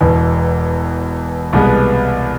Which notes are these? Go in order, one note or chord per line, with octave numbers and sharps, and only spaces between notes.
E1 E2 B2
C2 B2 G#3 B3